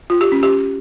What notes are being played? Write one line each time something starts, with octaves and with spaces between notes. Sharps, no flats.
F4
G4
C#4
G4